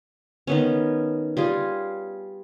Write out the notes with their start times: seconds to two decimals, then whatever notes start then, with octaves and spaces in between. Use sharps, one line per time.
0.47 D#3 B3 C#4
1.37 G3 F4 G#4